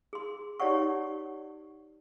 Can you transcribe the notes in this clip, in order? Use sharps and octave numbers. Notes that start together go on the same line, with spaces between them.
G#4 C6
D#4 G4 C#5 D5 F#5 C#6